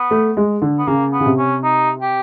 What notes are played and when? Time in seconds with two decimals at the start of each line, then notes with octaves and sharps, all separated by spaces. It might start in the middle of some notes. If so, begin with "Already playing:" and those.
Already playing: B3
0.11 A3
0.37 G#3
0.62 D3
0.79 B3
0.87 C#3 A#3
1.13 B3
1.20 C#3
1.26 C3
1.38 C#4
1.64 D#4
2.01 G4